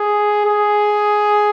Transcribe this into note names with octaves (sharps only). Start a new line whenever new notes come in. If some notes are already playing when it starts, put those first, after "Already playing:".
Already playing: G#4
G#4